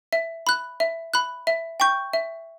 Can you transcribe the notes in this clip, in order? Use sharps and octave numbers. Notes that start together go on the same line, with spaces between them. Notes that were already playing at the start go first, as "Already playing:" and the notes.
E5
B5 F#6
E5
B5 F#6
E5
G5 C#6 G6
E5